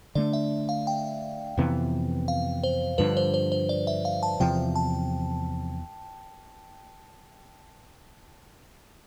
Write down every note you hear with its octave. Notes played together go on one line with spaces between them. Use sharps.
D3 A3 D4 D5
E5
F5
G5
F2 C3 E3 B3
F5
C5
G2 D3 F3 B4
C5
C5
C5
D5
E5
F5
A5
E2 C3 F3 G5
A5